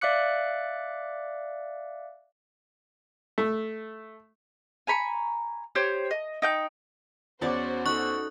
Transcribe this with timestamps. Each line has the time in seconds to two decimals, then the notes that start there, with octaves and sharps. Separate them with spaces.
0.01 D5 E5 F5 D6 F#6 C#7
3.38 A3
4.87 G#5 A#5 B5 C#6
5.75 G4 C5 C#5
6.11 D#5
6.42 D#4 G5 G6
7.41 E2 C#4 F#4 C5 D5 F#5 D6
7.86 D#4 A4 C#6 F#6